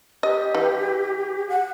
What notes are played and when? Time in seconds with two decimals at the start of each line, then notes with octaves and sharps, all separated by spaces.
0.23 G4 D#5
0.55 E3
1.49 F#5